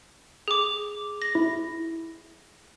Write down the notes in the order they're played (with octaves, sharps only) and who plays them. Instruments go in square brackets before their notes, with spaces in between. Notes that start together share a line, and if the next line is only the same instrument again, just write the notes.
[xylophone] G#4 D6
A#6
[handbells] E4